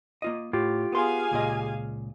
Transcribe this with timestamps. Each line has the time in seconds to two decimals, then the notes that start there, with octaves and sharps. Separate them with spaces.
0.22 A#3 F4 D#5
0.53 A2 F4 G4
0.92 B3 G#4 F5 G#5 C6
1.31 C#2 A#2 D#5